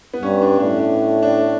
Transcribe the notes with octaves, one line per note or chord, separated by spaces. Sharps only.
B3
G2 C#4
D4
A2 D4
D4
D4